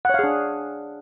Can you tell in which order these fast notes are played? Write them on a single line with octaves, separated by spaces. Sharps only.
F#5 C#5 F5 G#4 D4